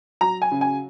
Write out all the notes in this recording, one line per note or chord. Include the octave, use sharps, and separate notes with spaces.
F#3 A#5
G#5
C#3
G#5